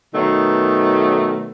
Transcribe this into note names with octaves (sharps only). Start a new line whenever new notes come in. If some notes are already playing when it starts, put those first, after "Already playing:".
B2 D#3 F#3 A3